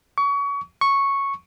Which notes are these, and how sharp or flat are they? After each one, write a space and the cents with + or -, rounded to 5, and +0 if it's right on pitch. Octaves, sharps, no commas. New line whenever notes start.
C#6 +30
C#6 -5